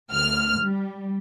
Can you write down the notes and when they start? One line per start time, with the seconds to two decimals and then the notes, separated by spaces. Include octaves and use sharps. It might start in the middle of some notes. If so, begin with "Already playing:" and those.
0.12 D2 F6
0.60 G3